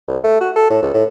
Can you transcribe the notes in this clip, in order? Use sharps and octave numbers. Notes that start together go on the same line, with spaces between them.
C2
A3
F#4
A4
A2
C#2
A2